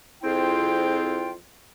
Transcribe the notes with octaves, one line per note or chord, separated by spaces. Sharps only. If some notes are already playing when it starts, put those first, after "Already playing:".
F2 C4 E4 F4 G#4 G5